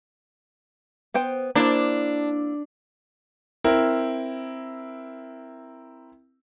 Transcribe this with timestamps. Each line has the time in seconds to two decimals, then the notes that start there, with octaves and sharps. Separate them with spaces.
1.14 B3 C5 G5
1.55 A#3 D4 E4 C5
3.64 C4 E4 A#4